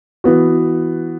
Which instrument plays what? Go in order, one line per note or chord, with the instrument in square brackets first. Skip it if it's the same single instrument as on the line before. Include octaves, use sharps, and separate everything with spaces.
[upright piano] E3 B3 F#4